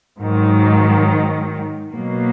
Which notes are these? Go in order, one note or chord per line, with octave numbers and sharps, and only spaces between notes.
G#2 D#3 F#3
B2 F#3 A#3